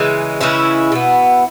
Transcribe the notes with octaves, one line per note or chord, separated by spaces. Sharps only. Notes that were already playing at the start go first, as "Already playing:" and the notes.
Already playing: C#3 E3 G#3
C#3 E3 G#3 C#4 E4
B2 B3